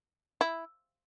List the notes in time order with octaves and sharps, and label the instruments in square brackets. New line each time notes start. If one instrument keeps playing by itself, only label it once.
[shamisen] E4